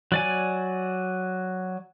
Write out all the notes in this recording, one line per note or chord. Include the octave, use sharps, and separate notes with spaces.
F#3 D5 G#5